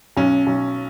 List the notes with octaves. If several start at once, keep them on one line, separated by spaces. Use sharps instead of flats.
B1 C#4
B1